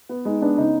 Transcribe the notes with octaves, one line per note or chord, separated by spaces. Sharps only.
B3
G#3 D#4
B3 D4
C#3 D#4